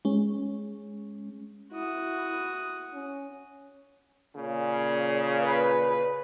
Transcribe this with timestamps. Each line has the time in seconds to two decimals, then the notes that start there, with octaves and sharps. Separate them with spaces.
0.05 G#3 C#4
1.73 E4 F#4 D#6
2.94 C#4
4.36 A#2 C#3
5.41 B4